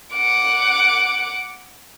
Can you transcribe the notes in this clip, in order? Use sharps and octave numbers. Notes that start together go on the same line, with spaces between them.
F#5 D6